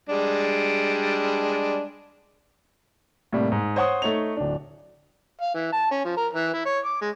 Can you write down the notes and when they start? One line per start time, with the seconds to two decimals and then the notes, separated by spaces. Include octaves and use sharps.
0.09 G3 G#3 D4
3.33 A2 C3 G3 A#3
3.52 G#2
3.76 C5 C#5 F#5 C6 D#6
4.02 A3 D#4 C#5 F7
4.37 D1 D4
5.41 F5
5.54 E3
5.73 A5
5.91 C#4
6.05 F3
6.17 A#4
6.33 E3
6.53 E4
6.65 C#5
6.85 D6
7.01 G#3